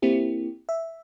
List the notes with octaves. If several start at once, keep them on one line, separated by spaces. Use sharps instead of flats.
A#3 C4 E4 G4
E5